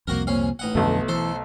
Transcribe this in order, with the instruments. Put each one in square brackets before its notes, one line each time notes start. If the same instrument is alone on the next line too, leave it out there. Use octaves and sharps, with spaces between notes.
[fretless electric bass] C2 F2 [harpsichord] A#3 F#4 A#4
[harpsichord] A#1 C#4 F5
A1 D#4 F#5
[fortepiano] B1 A3 [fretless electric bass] F2 D3
[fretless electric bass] E3 [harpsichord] A4 C5